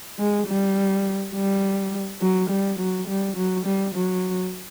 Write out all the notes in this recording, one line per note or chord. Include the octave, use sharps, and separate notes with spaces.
G#3
G3
G3
F#3
G3
F#3
G3
F#3
G3
F#3